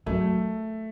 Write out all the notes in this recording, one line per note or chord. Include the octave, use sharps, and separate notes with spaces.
F#3 A3